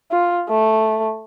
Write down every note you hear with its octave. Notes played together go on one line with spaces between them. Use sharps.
F4
A3